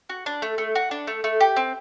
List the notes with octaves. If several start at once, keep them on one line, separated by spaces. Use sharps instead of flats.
F#4
D4
A3
A3
F#4
D4
A3
A3
G4
C4